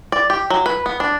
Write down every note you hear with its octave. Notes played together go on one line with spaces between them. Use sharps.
D5
G4
F#3
B4
B3
D4